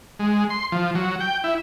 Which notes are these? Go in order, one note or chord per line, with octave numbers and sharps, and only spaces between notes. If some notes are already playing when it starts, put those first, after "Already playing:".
G#3
C6
F3
F#3
G5
E4